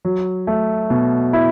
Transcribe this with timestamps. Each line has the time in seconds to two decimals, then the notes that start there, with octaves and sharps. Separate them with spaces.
0.05 F#3
0.47 A3
0.90 B2
1.33 E4